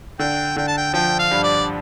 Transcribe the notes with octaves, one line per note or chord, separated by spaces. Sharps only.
D3 G5
D3 G5
A5
G5
F3 G5
F5
G2
D5